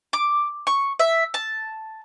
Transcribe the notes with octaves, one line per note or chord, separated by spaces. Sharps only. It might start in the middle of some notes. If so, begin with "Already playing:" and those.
D6
C#6
E5
A5